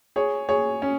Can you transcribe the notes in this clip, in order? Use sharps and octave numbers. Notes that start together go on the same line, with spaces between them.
G#4 C#5
G#4 C#5
C#4